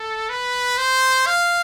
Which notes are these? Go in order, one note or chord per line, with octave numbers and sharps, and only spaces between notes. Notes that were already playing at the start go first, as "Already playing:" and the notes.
Already playing: A4
B4
C5
F5